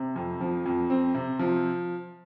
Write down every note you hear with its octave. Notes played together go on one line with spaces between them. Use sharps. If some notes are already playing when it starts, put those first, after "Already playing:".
Already playing: C3
F2
F3
F2
C4
C3
F3